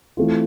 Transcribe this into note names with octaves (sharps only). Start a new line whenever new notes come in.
E3 A3 C4 F4